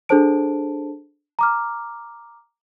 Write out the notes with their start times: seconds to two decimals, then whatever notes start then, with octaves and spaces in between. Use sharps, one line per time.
0.09 D4 G#4 A4 C5 A5 D7
1.39 A#5 D6 F6